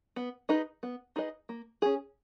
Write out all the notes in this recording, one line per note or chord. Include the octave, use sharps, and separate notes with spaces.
B3
D#4 G#4 B4 D#5
B3
D#4 G#4 B4 D#5
A#3
C#4 G#4